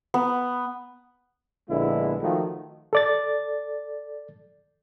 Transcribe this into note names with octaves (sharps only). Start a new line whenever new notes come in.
B3
A#1 D3 G#3 B3 E4
D#3 F3 A3 F#4
A4 D5 A6